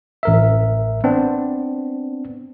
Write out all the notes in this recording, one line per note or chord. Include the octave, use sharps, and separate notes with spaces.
A1 A#4 E5
B3 C4 D4